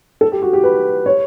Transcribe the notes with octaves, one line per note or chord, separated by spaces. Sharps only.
A4
G4
F#4
G4
B4
C#5